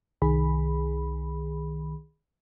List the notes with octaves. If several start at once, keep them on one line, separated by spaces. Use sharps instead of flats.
C2 D#3 G#4 B5